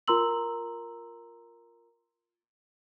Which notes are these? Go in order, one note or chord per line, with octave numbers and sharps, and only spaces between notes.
F4 A#4 A#5 C6 E6 F#7